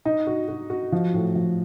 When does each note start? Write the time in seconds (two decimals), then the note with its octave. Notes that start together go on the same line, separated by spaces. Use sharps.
0.05 D#4
0.27 F#4
0.48 F#4
0.70 F#4
0.92 F3
1.14 A2
1.35 F3